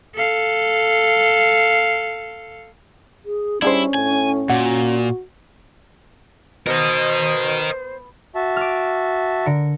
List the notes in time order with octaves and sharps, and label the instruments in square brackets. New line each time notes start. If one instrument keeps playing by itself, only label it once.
[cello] A4 F5
[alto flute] G#4
[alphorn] G3 [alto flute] C#4 [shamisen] D4 G#4 C5 [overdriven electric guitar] E4
[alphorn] A2 [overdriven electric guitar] G#5
[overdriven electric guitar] A#2 [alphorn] F#4 [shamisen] F#5
[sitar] B2 [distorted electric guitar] A#4 D#5 [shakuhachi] C5
[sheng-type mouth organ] F#4 E5 A5
[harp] D6 F6
D3 A#4 C#7